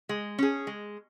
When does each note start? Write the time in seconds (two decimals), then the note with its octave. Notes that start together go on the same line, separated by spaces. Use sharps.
0.09 G#3
0.39 C#4 G#4
0.67 G#3